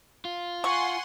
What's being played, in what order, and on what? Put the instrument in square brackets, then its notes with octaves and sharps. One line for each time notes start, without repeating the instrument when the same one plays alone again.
[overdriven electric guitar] F4
[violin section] F#5 G#5 C6 [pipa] C#6